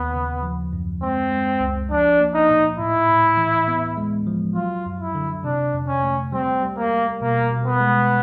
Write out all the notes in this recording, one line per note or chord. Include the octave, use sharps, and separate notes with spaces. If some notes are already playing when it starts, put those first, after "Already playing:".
Already playing: D#2 B3
C#3
F3
F#2
G#3 C4
G#3
C#2
F3 D4
A#3
D#4
A#2
A2 E4
A2
E3
B3
G#3
F3
F#3 F4
F#2
E4
D3
C3 D4
F2
C#4
A3
G3 C4
G3
A#3
G3
B2 A#3
B2
B3
G#3